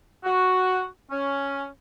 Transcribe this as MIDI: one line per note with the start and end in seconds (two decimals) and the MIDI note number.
0.25 0.85 66
1.11 1.67 61